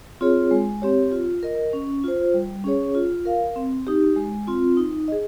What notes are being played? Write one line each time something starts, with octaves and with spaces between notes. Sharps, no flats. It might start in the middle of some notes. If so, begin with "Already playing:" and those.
C4 F4 G#4 C#5
G#3
C4 G4 C#5
F4
A#4 D#5
C#4
F4 C5
G3
C#4 G#4 C#5
F4
A#4 F5
C4
D#4 G4
G#3
C4 F4
D#4
G#4 D#5